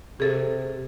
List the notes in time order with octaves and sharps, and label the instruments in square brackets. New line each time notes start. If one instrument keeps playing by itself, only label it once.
[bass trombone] C3 [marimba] G#4 A4